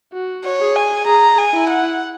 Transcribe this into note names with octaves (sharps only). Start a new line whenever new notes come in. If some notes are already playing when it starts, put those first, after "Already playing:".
F#4
C#5
G#4
G#5
G#4 A#5
G#5
E4
F#5